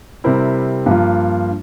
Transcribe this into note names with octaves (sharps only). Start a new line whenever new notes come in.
C3 G3 C4 E4 A#4
G2 F3 A#3 F4